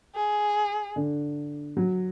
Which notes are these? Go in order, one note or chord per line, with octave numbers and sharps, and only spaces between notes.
G#4
D3
F#3